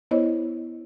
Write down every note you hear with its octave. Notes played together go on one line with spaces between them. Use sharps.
B3 E4 C5 C#5 D#5